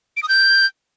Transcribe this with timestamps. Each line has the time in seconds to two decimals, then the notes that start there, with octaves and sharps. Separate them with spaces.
0.17 D7
0.23 D#6
0.29 G6